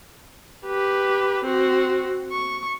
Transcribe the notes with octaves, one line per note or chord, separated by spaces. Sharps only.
G4 B4
C4 F#4
C#6